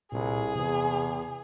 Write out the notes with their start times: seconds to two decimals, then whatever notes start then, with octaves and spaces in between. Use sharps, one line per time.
0.13 C2 A#2 G#4
0.56 E2 C3